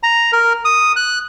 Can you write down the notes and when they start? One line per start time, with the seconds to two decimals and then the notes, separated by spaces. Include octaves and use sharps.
0.03 A#5
0.32 A#4
0.65 D#6
0.96 F#6